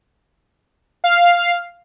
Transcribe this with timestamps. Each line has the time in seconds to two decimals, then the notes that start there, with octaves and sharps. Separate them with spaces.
1.04 F5